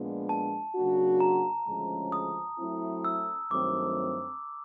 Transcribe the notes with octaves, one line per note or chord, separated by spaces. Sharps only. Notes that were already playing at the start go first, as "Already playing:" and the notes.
Already playing: A#2 F3 G#3 B3 D4
A5
C#3 F#3 A#3 D4 F#4
A#5
D2 C#3 F3 G#3 C#4
D#6
F#3 A3 C4 E4
E6
G2 D#3 F#3 A3 C4 D6